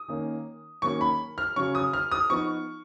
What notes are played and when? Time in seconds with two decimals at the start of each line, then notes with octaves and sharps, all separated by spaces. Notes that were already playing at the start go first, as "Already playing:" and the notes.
Already playing: D#6
0.08 D#3 A#3 C#4
0.82 D#3 F#3 A#3 C#4 C#6
1.01 B5
1.38 F6
1.56 C#3 F#3 C#4 C#6
1.75 D#6
1.93 F6
2.11 D#6
2.30 F3 B3 D#4 C#6